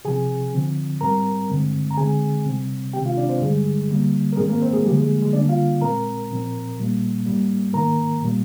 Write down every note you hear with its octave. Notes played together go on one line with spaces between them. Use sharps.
C3 F3 C4 G#4 G#5
D3 F3 C4
G#2 G3 C4 A#4 A#5
G2 D3 G#3 C4
A#5
D3 G#3 C4 G#4 G#5
C3 G3 C4
C3 D#3 G#3 C4 G4 G5
F4 F5
D4 D5
C4 C5
G2 D3 G3 G#3 G#4
D3 G3 A#3
A#4
G#2 D#3 G#3 C4 G#4
A#3 A#4
C4 C5
G#3 G#4
D3 F3 G3 A#3 G4
G#3 G#4
G#3 G#4
D3 G3 A#3 D4 D5
F4 F5
A#2 G#3 C4 A#4 A#5
A#2 F3 C4
A#2 G3 A#3
G#2 G3 A#3
G#2 D#3 A#3 A#4 A#5
A#2 G3 A#3